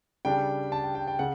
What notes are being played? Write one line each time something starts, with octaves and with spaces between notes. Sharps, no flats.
C#3 G3 D4 G5
A5
G5
G5
G5
C#3 F#5